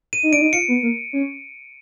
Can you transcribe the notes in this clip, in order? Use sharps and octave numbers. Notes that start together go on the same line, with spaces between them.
D#7
D#4
D4 D7
D#4
F4 C#7
B3
A#3
C#4